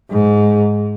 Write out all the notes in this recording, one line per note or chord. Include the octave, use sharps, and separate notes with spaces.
G#2